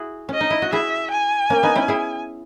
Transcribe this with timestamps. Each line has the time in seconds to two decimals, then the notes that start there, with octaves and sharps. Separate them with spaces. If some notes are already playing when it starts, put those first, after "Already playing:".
Already playing: E4 F#4 G#4
0.29 C#4
0.34 D#5
0.41 D#4
0.50 E4
0.62 F#4
0.72 E4 G#4 E5
1.11 G#5
1.50 A#3 C#4
1.63 B3 D#4
1.75 C#4 E4
1.88 E4 G#4